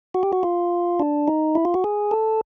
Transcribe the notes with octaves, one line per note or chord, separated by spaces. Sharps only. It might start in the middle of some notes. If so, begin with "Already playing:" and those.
F#4
G4
F#4
F4
D4
D#4
E4
F4
F#4
G#4
A4